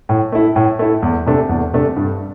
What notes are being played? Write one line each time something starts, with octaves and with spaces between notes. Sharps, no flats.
A2
A3 E4
A2
A3 E4
E2
C3 A3 D4
E2
C3 A3 D4
G2